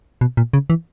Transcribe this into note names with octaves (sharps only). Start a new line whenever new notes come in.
B2
A#2
C#3
E3